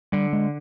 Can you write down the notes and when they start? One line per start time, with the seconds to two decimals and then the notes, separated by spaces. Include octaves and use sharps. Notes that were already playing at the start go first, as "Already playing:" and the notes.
0.12 D3 G3
0.33 G#3